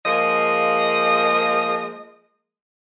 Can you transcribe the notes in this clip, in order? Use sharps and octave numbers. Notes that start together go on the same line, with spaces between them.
F3 G#3 A#3 G#4 D#5